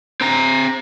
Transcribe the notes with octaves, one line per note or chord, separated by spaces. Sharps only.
C4 A#5